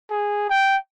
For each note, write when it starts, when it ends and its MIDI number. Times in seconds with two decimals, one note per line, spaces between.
0.10 0.49 68
0.50 0.77 79